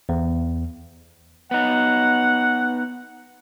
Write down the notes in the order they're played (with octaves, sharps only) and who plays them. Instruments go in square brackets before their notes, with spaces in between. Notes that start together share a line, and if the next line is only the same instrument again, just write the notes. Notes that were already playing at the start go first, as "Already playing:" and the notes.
[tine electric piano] E2
[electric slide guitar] B3 D#4 [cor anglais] F#5